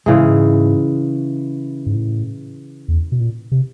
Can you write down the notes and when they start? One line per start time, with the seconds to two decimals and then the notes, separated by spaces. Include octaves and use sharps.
0.06 G#2 C#3 E3 G#3
0.16 A2
0.24 G#2
1.86 G#2
1.95 A2
2.88 E2
3.12 B2
3.20 A#2
3.52 C3